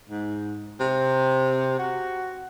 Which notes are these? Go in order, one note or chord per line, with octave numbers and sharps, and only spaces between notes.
G#2
C3
F#4